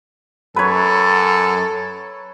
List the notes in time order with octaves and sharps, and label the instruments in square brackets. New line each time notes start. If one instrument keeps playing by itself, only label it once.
[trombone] F#2 [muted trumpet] A4 [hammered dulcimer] B4 C#5